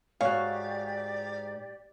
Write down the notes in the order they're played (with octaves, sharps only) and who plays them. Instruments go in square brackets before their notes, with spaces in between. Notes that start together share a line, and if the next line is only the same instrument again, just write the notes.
[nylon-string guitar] G#2 [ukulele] F#4 C#5 [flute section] G4 D5 [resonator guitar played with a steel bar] F5